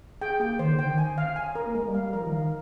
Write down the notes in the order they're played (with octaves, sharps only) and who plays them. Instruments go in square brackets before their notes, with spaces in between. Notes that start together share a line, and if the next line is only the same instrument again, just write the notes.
[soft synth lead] G#4 [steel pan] G5
[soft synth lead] A#3 [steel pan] G5
[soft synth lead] D#3 [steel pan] C5
[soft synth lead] D3
[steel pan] G5
[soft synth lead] D#3
[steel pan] G#5
F5
G#5
A#4
[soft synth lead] A#3
[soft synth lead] G#3 [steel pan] A#4
[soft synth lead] G3
[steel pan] F5
[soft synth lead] G3
[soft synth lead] F3 [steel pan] A#4
[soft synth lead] D#3
[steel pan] F5
[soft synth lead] D#3